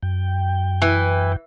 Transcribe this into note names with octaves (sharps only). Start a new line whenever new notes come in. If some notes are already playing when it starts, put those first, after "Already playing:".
F#2 G5
E3